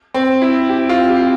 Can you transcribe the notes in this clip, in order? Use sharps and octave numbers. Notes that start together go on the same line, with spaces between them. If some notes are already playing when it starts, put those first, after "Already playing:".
C4
E4
G4
F4
G4